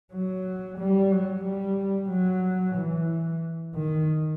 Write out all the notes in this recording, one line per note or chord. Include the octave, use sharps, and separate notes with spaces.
F#3
G3
F#3
G3
F#3
E3
D#3